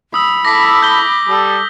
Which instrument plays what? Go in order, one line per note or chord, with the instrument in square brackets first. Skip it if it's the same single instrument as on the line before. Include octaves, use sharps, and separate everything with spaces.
[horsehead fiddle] B5 [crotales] D#6 E6
[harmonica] E4 A4 [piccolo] D6 [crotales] A#6 B6
[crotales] G6 G7
[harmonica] G3 A4